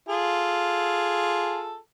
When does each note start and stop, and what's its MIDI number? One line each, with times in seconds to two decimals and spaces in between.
0.08 1.77 65
0.08 1.77 68
0.08 1.77 69